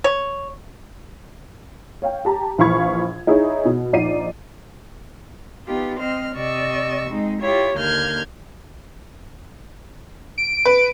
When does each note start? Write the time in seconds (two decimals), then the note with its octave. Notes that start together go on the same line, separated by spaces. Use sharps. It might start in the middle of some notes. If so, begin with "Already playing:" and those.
0.04 C#5
2.02 C#5 F5 G5
2.25 G4 A5 A#5
2.58 A#1 E3 F5 B5 C#6 G#6
3.27 D#4 E4 G#4 C#5
3.65 B2
3.93 A#1 D#4 D5 C7 D#7
5.67 B3 D#4 F4 G4
5.98 C4 C5 D#5 F6
6.35 C3 D5 D#5 C#6 E6
7.10 G#3 C4 D#4
7.41 E4 F4 G4 C#5
7.75 D#2 D3 A#3 F6 G6 G#6
10.38 D7
10.65 B4